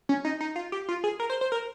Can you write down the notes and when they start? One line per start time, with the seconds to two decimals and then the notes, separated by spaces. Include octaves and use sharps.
0.09 C#4
0.25 D#4
0.41 D#4
0.56 F4
0.72 G4
0.89 F4
1.04 G#4
1.20 A#4
1.30 C5
1.41 C5
1.52 A#4